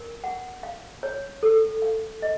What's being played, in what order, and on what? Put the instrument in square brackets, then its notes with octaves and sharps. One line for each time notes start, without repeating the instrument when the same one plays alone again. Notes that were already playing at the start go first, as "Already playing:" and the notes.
Already playing: [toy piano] A#4
F#5
F5
C#5
A4
F5
D#5